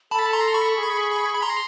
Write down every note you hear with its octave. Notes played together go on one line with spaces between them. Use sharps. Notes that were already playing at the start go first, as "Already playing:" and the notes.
A4 A5 B5
A#5 C6
B5 C#6
G#4
B5
A#5 C6